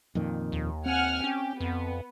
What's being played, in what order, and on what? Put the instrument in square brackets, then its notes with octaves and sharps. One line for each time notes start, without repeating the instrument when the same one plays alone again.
[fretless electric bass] F2 A#2 D#3
[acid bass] D#2
[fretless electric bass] C4 [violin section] F#5 G#5 F6
[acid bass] C#4 [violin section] G4
[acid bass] F2 [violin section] B3